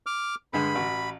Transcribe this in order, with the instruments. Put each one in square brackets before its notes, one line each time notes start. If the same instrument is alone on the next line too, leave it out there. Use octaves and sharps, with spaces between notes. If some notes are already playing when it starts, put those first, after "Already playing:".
[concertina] D6 F6
[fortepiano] G2 D3 G#3 [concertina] B5
[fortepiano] A1 F#4